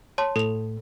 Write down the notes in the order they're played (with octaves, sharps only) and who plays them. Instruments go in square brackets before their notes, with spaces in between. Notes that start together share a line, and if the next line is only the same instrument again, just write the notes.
[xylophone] C#5 A5 C6
[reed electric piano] A2 [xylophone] A4 F7